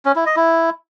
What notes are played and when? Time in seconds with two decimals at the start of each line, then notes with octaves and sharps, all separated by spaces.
0.05 C#4
0.16 E4
0.26 D#5
0.36 E4